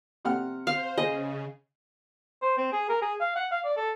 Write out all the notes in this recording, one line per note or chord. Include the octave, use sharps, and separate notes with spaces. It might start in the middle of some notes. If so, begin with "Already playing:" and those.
C3 F#5 F6
C5 F5
C#3 G#4 D#5
C5
C4
G#4
A#4
G#4
F5
F#5
F5
D5
A4